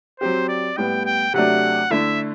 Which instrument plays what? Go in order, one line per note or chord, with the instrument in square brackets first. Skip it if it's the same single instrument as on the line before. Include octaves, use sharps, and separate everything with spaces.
[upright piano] F#3 C4 G4 [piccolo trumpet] C5
[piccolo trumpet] D5
[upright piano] A2 G3 B3 [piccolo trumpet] G5
[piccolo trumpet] G5
[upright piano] C3 F#3 A3 D4 [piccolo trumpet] F#5
[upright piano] D3 A3 E4 [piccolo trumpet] E5